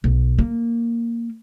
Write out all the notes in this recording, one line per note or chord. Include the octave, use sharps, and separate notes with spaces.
B1
A#3